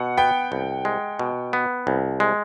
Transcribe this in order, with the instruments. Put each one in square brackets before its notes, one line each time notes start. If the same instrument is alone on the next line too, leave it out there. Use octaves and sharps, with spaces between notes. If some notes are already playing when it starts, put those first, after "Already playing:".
Already playing: [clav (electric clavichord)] B2 [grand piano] F#5
[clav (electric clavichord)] B3 [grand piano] G5
[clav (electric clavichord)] C2
G#3
B2
B3
C2
G#3